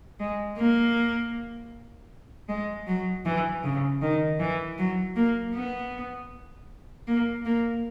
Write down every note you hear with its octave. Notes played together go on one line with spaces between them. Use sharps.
G#3
A#3
G#3
F#3
E3
C#3
D#3
E3
F#3
A#3
B3
A#3
A#3